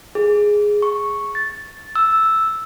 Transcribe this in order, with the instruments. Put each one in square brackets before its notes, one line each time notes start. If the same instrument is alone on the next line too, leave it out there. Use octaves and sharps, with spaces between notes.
[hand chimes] G#4
C#6
A6
E6